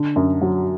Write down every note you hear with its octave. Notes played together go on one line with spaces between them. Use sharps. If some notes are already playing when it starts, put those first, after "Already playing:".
Already playing: D3
F#2
F#3